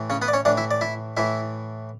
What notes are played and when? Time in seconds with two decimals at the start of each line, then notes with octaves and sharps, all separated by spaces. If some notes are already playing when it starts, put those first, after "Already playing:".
Already playing: A2 E3
0.10 C#3 C#4
0.22 B3 B4
0.28 D5
0.33 C#4 C#5
0.45 A2 E3 D4 D5
0.57 E4 E5
0.71 D5
0.81 E4 E5
1.17 A2 E3 E4 E5